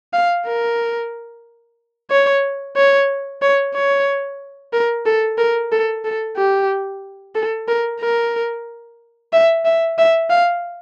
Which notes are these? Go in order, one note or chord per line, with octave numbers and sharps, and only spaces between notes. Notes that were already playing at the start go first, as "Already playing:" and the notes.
F5
A#4
C#5
C#5
C#5
C#5
A#4
A4
A#4
A4
A4
G4
A4
A#4
A#4
E5
E5
E5
F5